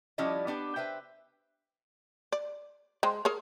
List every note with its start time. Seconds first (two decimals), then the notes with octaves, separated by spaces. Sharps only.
0.18 F3 G3 C#4 E4 D5 D#5
0.47 B3 D4 G4 B4
0.76 B4 C5 E5 G5
2.32 D5
3.03 G#3 C5 G5
3.25 G#4 A#4 C#5